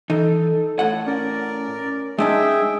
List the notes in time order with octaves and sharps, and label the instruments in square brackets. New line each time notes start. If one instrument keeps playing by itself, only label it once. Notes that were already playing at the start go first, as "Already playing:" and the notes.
[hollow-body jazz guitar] E3 D#4 [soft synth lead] A4
[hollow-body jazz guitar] A2 F#5
[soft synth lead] C#4 [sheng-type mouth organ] A#4 D5
[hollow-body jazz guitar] G#3 D4 D#4 [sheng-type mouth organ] G#4 E5 G5